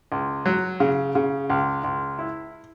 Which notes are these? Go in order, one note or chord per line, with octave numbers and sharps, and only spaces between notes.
C#2
F#3
C#3
C#3
C#2
C#2
E4